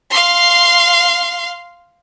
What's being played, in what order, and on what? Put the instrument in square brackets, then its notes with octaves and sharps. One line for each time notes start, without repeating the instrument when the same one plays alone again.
[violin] F5 C6